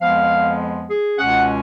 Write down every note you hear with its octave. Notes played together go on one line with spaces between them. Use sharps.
F2 F3 G#3 B3 F5
G#4
C#2 B2 G#3 C#4 F#5